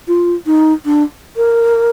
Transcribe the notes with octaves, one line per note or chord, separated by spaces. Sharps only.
F4
D#4
D4
A#4